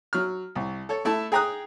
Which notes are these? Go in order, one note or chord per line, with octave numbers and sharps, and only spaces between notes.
F#3 F6
C2
A4 C#5
A3 E4 E5 A5
G#4 G5 A#5 D#6 F#6